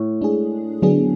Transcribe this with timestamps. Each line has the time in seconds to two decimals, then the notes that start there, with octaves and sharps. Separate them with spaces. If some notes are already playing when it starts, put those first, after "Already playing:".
Already playing: A2
0.21 G#3 D4 G#4
0.82 D3 F#3 B3 D4 G#4